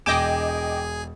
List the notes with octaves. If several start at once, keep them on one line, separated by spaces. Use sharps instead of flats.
E1 G#4 D#5 G5 G#5 D6 E7